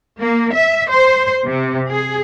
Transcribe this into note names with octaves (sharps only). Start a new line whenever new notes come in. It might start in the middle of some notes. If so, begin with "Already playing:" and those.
A#3
E5
C5
C3
G#4